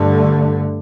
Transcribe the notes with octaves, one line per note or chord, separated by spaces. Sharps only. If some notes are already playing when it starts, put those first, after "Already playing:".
Already playing: G2 D3 A3